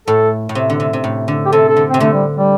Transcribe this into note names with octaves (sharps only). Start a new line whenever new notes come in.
A2 A4
A2
C3
D3
C3
C3
A2
D3
G4
C3 A4
A4
D3
C3 C4
D3 A3
G3
G3